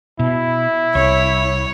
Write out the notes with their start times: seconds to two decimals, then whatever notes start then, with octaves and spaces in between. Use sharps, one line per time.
0.19 B2 E4
0.95 C2 C#5